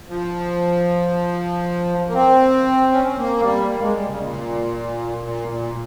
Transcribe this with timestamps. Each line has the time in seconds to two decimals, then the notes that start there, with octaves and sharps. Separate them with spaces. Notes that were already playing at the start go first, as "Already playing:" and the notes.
0.08 F3
2.08 A#3
2.14 C4
2.92 C#4
3.04 C4
3.18 A#3
3.42 G3
3.68 A#3
3.81 G#3
3.95 G3
4.08 C#3
4.21 A#2
5.23 A#2
5.48 A#2